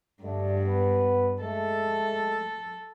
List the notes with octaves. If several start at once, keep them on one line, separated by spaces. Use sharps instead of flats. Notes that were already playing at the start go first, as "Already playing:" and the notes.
G2 D3 A3 D4
B3 B4
G#3 A3 A4